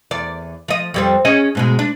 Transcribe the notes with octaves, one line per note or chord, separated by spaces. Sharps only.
E2 D5
F3 D#5
F2 G3 C4
C#4 G#4 D#5
G#2 B2 G#3
D4